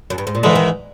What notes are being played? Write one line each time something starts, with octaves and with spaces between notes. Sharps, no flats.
F#2
G2
G#2
A#2
G#2 D3 E3 G#3
D#3